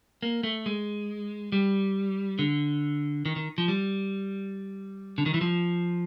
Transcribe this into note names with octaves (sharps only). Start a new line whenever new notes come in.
A#3
A3
G#3
G3
D3
D#3
D#3
F3
G3
D3
D#3
E3
F3